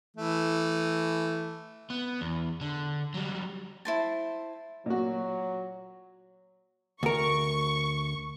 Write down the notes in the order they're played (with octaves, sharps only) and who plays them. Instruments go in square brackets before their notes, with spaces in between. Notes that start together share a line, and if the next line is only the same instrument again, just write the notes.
[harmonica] E3 A3
[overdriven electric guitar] B3
E2
D3
F#3 G3
[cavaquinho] E4 C5 A5
[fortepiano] A#2 F#4 [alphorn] F#3
[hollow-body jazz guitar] D2 A#4 [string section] C#6